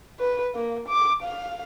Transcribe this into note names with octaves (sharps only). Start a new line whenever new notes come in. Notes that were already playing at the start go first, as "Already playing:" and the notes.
B4
A#3
D6
F5